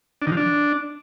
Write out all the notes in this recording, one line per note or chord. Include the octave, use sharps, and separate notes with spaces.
D4
D#3
F3
D4